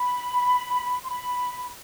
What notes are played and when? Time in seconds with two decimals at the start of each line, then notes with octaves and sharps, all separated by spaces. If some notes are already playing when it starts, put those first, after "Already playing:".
Already playing: B5
1.04 C6
1.09 B5